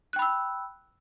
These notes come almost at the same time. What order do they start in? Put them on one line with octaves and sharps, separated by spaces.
F#6 G5 B5 E6